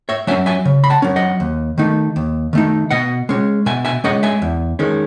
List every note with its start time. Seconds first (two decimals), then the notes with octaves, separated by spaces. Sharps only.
0.09 C#5 E5
0.27 F#3 E5 G#5
0.31 C#4
0.46 E5 G#5
0.65 C#3
0.84 B5
0.90 F#5 A5
1.02 F#3 C#4
1.16 D#5 F#5
1.40 D#2
1.78 D#3 A3 D#4
2.16 D#2
2.53 D#3 A3 D#4
2.91 B2 D#5 F#5
3.29 G#3 C#4
3.66 B2 E5 G#5
3.85 E5 G#5
4.04 G#3 C#4 D#5 F#5
4.23 E5 G#5
4.42 E2
4.79 D#3 G#3 C#4